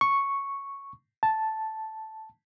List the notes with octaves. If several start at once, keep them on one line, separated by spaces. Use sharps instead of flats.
C#6
A5